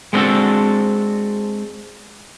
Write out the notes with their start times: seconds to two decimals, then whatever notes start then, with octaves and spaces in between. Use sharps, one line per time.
0.13 G#3 B3 C4 D4 F#4 A4